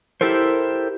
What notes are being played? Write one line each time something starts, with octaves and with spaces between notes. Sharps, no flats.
E4 G4 A4 A#4 C5